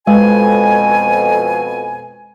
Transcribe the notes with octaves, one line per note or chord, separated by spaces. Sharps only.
F2 B2 G#3 G#5